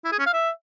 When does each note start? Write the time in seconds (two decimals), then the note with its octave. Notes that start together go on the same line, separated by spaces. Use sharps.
0.05 E4
0.12 G#4
0.19 C#4
0.26 F5
0.33 E5